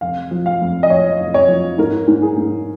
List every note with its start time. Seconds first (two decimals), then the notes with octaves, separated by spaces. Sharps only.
0.01 F1 F5
0.31 F3
0.46 F5
0.61 F2
0.83 D#5
0.90 F3 C#5
1.20 F1
1.34 C#5
1.48 F3
1.78 G#2 A#4
2.08 G#2
2.22 G#4
2.37 G#2